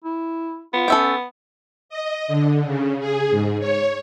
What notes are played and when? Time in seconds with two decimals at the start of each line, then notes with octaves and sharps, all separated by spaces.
0.04 E4
0.74 B3 F4
0.88 C#4 A4 E5 G5
1.89 D#5
2.28 D3
2.65 C#3
2.99 G#4
3.30 G#2
3.60 C#5